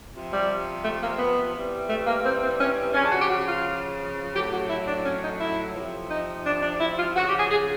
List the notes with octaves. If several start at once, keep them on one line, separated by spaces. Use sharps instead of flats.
C3 F3
G3
A3
A#3
B3
C3 E3 G3
A3
A#3
C4
C4
C#4
C#3 F3 C#4
D4
F#4
G4
F#4
F4
A2 F#3 G4
F#4
E4
D4
C#4
D#4
E4
C3 F3
D#4
D4
D4
E4
F4
C#3 F3 F#4
G4
G#4
G#4